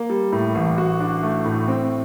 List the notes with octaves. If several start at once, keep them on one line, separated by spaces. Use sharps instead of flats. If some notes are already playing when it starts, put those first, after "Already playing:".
Already playing: A#3
G3
A2
A1
F#4
D4
A3
A2
C4